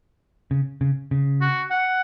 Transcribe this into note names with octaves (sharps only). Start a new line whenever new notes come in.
C#3
C#3
C#3
F#4
F#5